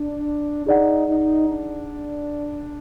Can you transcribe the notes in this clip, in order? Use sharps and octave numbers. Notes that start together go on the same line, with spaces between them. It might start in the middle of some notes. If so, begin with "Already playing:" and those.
Already playing: D4
D#4 G#4 D5 F#5
D#4
D4